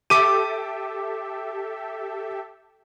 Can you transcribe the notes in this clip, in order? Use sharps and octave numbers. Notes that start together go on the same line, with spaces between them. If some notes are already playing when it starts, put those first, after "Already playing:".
G4 A4 E5 D6 D#7